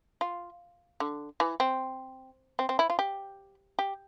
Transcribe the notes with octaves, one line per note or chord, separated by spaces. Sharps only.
F4
D3
E3
C4
C4
C4
E4
F4
G4
G4